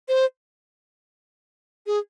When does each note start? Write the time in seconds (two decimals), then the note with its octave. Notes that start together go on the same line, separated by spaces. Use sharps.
0.08 C5
1.87 G#4